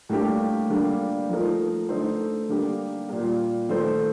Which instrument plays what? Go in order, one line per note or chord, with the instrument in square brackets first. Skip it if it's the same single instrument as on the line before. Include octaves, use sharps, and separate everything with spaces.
[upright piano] A2 G3 A#3 D4 G4
D3 G3 A#3 D4
F3 A3 D#4 A#4
D3 A3 D#4 A4 C5
D3 G3 A#3 D4 G4
A#2 G3 A#3
D#3 A3 D#4 A4 C5